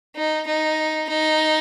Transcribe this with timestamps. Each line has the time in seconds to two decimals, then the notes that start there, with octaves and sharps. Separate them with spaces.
0.16 D#4
0.47 D#4
1.09 D#4